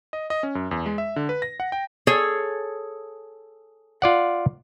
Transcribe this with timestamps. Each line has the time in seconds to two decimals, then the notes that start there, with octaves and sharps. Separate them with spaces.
0.13 D#5
0.30 D#5
0.43 C#4
0.55 F#2
0.71 E2
0.86 G#3
0.98 E5
1.16 D3
1.29 B4
1.42 A#6
1.60 F#5
1.72 G5
2.07 G#4 A4 C#5
4.02 F4 D5 F#5